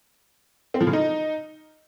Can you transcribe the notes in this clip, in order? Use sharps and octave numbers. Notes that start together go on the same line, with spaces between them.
C4
F3
C#3
D#4